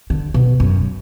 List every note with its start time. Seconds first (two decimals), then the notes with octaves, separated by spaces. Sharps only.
0.10 D3
0.34 B2
0.60 F#2